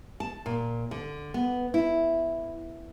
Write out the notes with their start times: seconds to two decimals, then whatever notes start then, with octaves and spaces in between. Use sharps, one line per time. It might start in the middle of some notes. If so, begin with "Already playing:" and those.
0.20 A5
0.46 A#2
0.91 D3
1.34 B3
1.74 E4